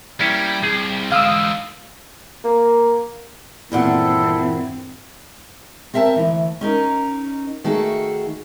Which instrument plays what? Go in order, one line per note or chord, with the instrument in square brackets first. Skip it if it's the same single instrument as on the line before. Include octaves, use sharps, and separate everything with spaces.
[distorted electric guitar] G3 [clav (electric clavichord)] A#3 C#4 E4
[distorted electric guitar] C2 [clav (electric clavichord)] G#4
[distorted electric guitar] G#2 D3 [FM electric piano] F5 D#6 E6
[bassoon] A#3
[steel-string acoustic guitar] E2 A#2 F#5 [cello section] G2 D#3 C4 [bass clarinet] E4 [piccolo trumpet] A4
[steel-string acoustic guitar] C4 A#4 E5 G5 A5
D2 E3
C#4 D#4 A#4
D#3 A3 F#4 G#4 A4